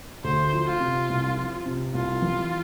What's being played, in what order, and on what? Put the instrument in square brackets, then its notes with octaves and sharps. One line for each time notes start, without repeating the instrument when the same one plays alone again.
[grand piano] D2 [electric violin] C5
[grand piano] F3
[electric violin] F4
[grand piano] C3
C2
F3
C3
[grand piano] C2 [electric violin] F4
[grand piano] E3